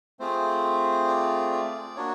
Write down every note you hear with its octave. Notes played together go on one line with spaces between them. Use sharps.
A3 C4 F4 G#4 C5
D5
D5
A#3 D4 F#4 C#5